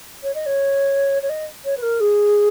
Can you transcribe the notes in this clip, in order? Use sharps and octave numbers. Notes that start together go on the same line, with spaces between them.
C#5
D#5
C#5
C#5
D#5
C#5
B4
A#4
G#4